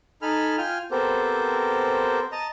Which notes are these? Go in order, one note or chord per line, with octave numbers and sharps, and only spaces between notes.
D#4 A4 G#5 B5 F6
F4 G5 G#5 F6
B3 C4 G4 A4 A#4 C5
D#5 A5 A#5